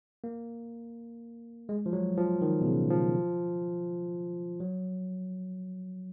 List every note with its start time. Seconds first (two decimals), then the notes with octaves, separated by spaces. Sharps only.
0.24 A#3
1.69 G#3
1.86 F3
1.93 F#3
2.18 F3
2.42 D#3
2.61 B2
2.66 C#3
2.90 F3
4.60 F#3